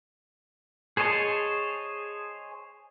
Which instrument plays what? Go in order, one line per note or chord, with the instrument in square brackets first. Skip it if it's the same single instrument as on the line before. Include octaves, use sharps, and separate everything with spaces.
[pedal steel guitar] G#4 C5 C#5 D#5 A5